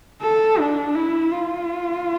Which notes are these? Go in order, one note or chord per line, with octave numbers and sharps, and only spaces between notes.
A4
D4
E4
F4